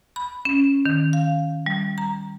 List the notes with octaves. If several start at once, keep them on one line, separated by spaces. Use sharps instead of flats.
B5
C#4
D#3
F5
G3
A#5